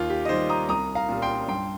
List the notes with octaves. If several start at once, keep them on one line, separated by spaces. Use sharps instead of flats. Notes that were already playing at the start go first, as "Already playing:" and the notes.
Already playing: D#2 F4
G4
D#5
D#3 G3 G4 C5
A#5 D#6
C2 A#5 D#6
F5 A#5
A#2 G3
G5 C6
G2 G5 C6